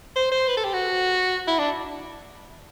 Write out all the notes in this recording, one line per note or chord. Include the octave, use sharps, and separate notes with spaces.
C5
C5
B4
A4
G4
F#4
E4
D4